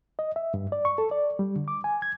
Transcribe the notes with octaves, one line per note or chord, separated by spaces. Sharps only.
D#5
E5
G2
D5
C#6
A4
D5
G3
D3
D6
G#5
G#6